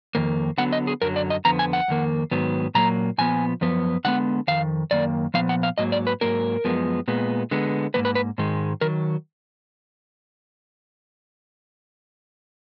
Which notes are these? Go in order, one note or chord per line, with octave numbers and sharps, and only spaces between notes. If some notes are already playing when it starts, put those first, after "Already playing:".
F2 D#3 A#3
D3 F#3 B3 F#5
D#5
G#4
F#2 D3 F#3 A#4
D5
D#5
F2 D3 F3 B3 A#5
G#5
F#5
F2 D#3 A#3
G#2 D#3 F#3 B3
A#2 F#3 A#3 A#5
A#2 F3 B3 G#5
F#2 F3 B3
D3 G#3 B3 F#5
F2 D#3 F5
F#2 D#3 A#3 D5
A#2 F3 B3 F5
F#5
F5
G#2 F#3 A#3 D#5
D5
B4
G#2 F#3 A#3 A#4
F#2 F3 G#3 B3
A#2 G#3 B3
D3 G#3 B3
G#2 D#3 A#3 B4
B4
B4
G#2 D#3 G#3
D#3 F#3 A#4